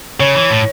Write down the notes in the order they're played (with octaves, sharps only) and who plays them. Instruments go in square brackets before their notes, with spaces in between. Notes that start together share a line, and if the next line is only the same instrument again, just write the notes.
[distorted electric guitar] C#3 [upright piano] C#5
[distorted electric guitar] E3
A2